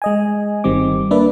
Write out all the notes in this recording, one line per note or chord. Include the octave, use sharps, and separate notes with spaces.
G#3 D#5 G#5
G1 D#3 G3 C4 D6
A#3 D4 B4 D5 E5